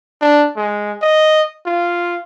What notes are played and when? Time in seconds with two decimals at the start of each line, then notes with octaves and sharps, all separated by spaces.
0.22 D4
0.57 G#3
1.02 D#5
1.66 F4